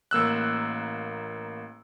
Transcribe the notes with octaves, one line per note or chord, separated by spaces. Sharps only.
A1 A#3 E6 F#6